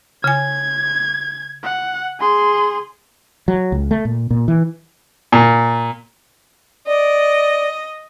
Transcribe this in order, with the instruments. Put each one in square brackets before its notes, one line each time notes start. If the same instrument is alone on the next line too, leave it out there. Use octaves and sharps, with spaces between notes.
[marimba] C#3 G#5 [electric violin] G#6
[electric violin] F#5
G#4 C6
[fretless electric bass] F#3
C#2
A3
A#2
A#2
E3
[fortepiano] A#2
[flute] D5 [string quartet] D#5